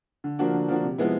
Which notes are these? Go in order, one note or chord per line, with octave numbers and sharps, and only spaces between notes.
D3
F3 A#3 D4 F#4
D3
F3 A#3 D4 F#4
C3
F3 G#3 B3 E4